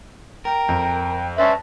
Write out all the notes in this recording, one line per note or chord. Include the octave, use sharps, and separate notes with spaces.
A#4 G5
F2
C#4 B4 D5 E5 A5 C6